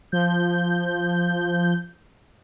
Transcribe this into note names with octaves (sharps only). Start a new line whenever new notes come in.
F3 G6